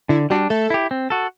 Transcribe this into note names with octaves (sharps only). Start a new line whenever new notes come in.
D3 E4
G3 D4 F#4
A3 A4
E4 G4
C4
F#4 A4